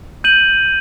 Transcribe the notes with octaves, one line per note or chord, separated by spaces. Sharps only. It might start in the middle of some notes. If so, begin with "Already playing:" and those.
G6 D#7 F#7